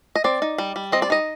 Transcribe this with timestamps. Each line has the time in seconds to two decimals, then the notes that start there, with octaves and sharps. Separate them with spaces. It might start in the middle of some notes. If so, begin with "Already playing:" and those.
0.16 D#5
0.24 C4 D5
0.42 D#4
0.58 G3
0.76 G3
0.92 C4 D#5
1.02 D5
1.10 D#4 D#5